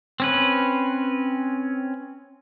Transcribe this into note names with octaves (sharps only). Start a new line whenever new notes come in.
C4 C#4 B4